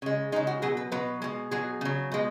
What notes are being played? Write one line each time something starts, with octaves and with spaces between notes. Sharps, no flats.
C#3 G#3
C#3 G#3 D#4
F#4
B2 F#3 G#4
B4
B2 F#3 B4
B2 G#3
B2 F#3 G#4
C#3 F#3
B2 G#3